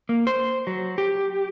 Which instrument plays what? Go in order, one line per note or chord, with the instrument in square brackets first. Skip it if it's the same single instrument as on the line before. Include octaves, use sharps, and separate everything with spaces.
[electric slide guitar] A#3
C5
F#3
G4